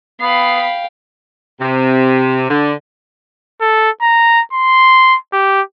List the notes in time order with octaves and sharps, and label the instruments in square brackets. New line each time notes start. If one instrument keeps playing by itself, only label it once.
[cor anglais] B3 [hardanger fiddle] F5 G5 [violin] B5 C7
[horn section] C3
D3
[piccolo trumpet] A4
A#5
C6
G4